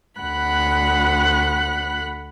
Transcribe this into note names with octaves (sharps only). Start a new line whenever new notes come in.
D2 F#5 B5 F#6